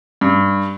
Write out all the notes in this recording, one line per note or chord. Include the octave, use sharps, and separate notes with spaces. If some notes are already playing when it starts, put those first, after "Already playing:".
G2